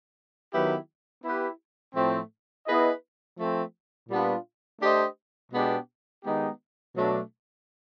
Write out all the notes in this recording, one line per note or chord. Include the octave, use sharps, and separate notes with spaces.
D#3 F#3 B3 E4 G4
B3 E4 G4 B4
A2 F3 A3 C4
B3 E4 G#4 B4 D#5
F3 A3 C4
A#2 G3 B3 D4 F4
A3 D4 G4 C5 D#5
B2 G#3 B3 D4 G4
D#3 G#3 B3 D#4 G4
B2 F#3 A3 D4